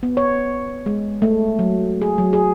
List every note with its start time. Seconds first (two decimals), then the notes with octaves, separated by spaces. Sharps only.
0.03 B3
0.17 C#5
0.86 G#3
1.22 A3
1.59 F#3
2.02 G#4
2.18 F#3
2.33 G#4